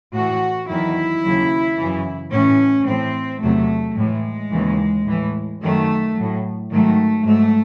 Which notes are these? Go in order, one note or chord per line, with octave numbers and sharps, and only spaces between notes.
A2 E3 F#4
E2 D#3 F#3 E4
D#2 C#3 F#3
F#2 C#3 E3
A2 E3 C#4
A2 E3 C4
E2 C3 F#3 A3
A2 E3 G#3
D#2 C#3 E3
A2 E3
F#2 D#3 F#3 A3
A2 F#3
G#2 D#3 F#3 A3
G#2 F#3 A3